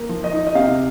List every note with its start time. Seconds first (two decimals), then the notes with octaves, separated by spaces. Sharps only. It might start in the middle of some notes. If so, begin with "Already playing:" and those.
Already playing: A#3
0.09 F3
0.24 D#5
0.32 D#4
0.47 D#5
0.55 C3 F5